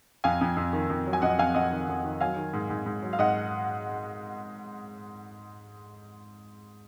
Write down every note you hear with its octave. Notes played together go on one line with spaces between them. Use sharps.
F2 F5 G#5
F2
F2
D#3
F2
F#3
G#5
F2 D#5 F#5
F2 F5 G#5
F2 D#5 F#5
D#3
F2
D#3
F#3 F5 G#5
D#3
G#2
G#2
G#2
F#3
F5
G#2 D#5 F#5